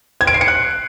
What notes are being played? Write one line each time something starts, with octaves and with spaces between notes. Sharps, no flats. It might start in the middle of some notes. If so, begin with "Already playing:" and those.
G#6
D7
C7
C#7
F#6